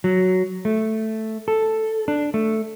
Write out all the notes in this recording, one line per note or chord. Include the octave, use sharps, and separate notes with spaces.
F#3
A3
A4
D4
A3